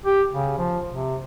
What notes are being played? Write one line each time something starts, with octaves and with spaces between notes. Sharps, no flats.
G4
C#3
F3
C3